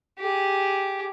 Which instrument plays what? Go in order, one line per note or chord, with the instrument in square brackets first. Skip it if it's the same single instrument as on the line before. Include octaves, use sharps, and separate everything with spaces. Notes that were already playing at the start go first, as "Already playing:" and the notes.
[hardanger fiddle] G4 G#4